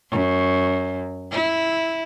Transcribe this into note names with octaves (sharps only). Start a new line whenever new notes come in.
F#2
E4